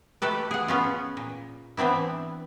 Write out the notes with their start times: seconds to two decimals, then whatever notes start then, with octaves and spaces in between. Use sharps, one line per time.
0.22 A3 G4 A4 B4
0.51 G#4 F#5
0.68 B3 C#4 F4
1.17 A#2
1.77 E3 B3 C4 D4 E4